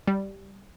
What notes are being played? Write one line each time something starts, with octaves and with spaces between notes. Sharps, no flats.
G3